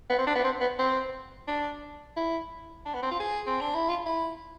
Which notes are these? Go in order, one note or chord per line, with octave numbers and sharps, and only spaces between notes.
B3
C4
D4
B3
C4
B3
C4
D4
E4
D4
B3
C4
F4
G#4
C4
D4
E4
F4
E4